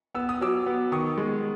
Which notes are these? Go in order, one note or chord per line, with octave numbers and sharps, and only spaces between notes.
B3 E6
D#6
F#3 D6 E6
B3
D#3 C#6 D#6
G#3